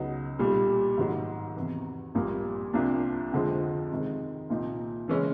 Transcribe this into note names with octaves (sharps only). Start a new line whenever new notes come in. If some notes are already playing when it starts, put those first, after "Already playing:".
Already playing: C#2 C#3 F#3 B3 D#4
B1 A#2 G3
G#2 D#3 F#3
E2 C3 E3
A#1 A#2 G3 A#3
C2 C3 F3 A#3 D4
F2 D3 F3 G#3 C4
C3 D#3 G#3
C2 A#2 F3 A#3 D#4
C#3 E3 G#3 C#4